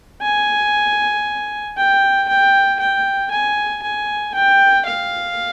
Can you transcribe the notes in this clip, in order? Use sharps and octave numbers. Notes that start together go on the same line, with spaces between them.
G#5
G5
G5
G5
G#5
G#5
G5
F5